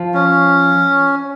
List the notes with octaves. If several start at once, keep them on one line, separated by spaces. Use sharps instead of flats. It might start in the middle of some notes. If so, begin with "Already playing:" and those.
Already playing: F3
C#4